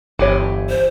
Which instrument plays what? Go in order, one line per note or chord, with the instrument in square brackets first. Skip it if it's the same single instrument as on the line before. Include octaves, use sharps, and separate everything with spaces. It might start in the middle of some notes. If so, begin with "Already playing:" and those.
[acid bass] G1 [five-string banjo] E3 G4 C#5
[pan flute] C5